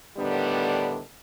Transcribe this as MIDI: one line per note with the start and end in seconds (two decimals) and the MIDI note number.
0.17 1.00 45
0.17 1.00 50
0.17 1.00 51
0.17 1.00 55
0.17 1.00 59
0.17 1.00 62